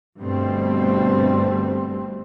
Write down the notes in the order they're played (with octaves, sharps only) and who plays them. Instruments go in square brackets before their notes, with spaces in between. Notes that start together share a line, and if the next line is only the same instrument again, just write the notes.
[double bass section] G1 G2 B2 G3 A3 C4